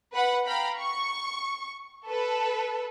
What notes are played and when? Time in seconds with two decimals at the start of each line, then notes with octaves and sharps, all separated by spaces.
0.13 B4 F#5 B5
0.45 F5 G5 A#5 B5
0.80 C#6
2.07 A4 B4